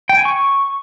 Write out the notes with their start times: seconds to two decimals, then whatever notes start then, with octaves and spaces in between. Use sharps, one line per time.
0.09 G5
0.17 G#5
0.25 C#6